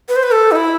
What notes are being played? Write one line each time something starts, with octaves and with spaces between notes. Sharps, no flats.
B4
C5
B4
A4
D#4
E4